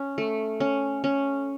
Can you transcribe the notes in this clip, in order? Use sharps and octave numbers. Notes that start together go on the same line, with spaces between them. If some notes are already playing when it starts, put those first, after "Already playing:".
Already playing: C#4
A3
C#4
C#4